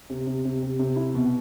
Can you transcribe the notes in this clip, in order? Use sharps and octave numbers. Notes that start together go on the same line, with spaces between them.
C3
C3
C3
C3
C3
E4
B2